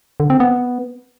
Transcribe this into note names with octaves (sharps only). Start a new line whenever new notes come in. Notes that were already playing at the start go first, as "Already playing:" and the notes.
D3
C4
B3